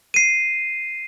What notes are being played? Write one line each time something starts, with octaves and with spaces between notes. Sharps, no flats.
C7 D#7